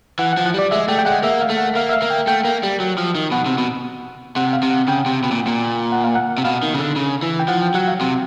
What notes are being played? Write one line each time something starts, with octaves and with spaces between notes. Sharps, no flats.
E3 F#5
F#5
F3
F#5
G3 D5
G#3 E5
A3 G5
G5
G#3 F#5
A#3 E5
F5
A3
F#5
A#3 F5
E5
F5
A#3
G5
A3 G5
A#3
G3
F#3
F3
D#3
B2 F#5
C3
B2
C3 F#5
F5
C3
F#5
C#3 G5
C3
B2
A#2
A#2
F#5
F5
F#5
C3
B2 F5
D#3
C#3
D3
C#3
E3
G5
F3 F#5
G5
F#3 F#5
F5
C3